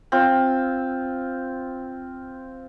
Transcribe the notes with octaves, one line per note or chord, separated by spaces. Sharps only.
C4 F4